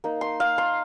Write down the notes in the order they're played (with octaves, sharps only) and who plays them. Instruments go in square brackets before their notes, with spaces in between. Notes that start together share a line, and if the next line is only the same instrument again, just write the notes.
[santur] A#3 D#4
C6
F5
C6